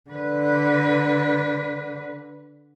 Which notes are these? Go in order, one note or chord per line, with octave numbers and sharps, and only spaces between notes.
D3 B4